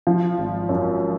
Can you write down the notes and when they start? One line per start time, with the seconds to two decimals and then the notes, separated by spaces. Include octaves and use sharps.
0.07 F3
0.38 G#1
0.69 F#2